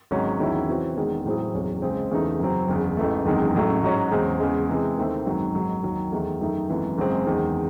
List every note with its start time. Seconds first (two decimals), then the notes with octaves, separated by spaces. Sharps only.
0.11 G#1 G#2 F#3 C#4
0.39 E2 D#3 F#3 C#4 E4
0.68 C3 E3 C4 F#4
0.97 E1 E2 D#3 G#3
1.25 A2 F#3 C4 E4 G#4
1.54 F#1 E2 C3 F#3 C#4
1.82 C#2 C#3 G#3 C4
2.11 E2 C#3 E3 A3 D#4
2.40 F#2 C#3 F#3 C4
2.68 F#1 E2 C#3
2.97 A1 G#2 E3 A3
3.26 F#1 E2 C3 D#3 G#3
3.55 A1 A2 F#3 A3
3.83 G#2 F#3 C#4 F#4
4.12 E2 C#3 G#3 C4
4.40 E2 C#3 G#3
4.69 C3 E3 G#3
4.98 D#2 D#3 A3 C4
5.26 G#1 F#2 D#3 F#3
5.55 G#1 G#2 F#3
5.83 D#2 D#3 F#3
6.12 E2 D#3 A3
6.41 F#2 D#3 A3 D#4
6.69 G#1 F#2 E3 A3
6.98 G#1 F#2 C#3 G#3 C4
7.27 E2 D#3 G#3